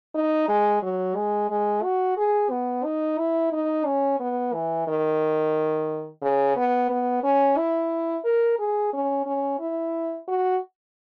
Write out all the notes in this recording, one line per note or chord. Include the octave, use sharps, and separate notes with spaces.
D#4
G#3
F#3
G#3
G#3
F#4
G#4
B3
D#4
E4
D#4
C#4
B3
E3
D#3
C#3
B3
B3
C#4
E4
A#4
G#4
C#4
C#4
E4
F#4